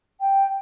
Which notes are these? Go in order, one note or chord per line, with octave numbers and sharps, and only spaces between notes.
G5